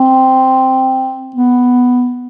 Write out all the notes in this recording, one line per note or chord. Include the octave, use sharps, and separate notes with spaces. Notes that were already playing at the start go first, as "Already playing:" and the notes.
Already playing: C4
B3